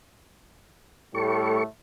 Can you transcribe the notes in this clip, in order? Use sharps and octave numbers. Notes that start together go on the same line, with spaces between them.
A2 G3 A3 A4 C#6